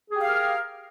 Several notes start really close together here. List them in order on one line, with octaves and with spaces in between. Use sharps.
G#4 G4 F5 A#4